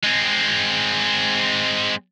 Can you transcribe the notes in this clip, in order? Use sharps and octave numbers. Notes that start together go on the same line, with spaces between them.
G#3 C4